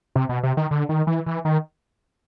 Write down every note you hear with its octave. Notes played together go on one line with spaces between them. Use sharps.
C3
B2
C3
D#3
D3
D#3
E3
E3
D#3